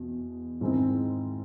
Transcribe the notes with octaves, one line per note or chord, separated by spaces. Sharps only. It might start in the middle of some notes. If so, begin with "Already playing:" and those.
Already playing: E2 B2
G#2 D#3 G#3 C4 E4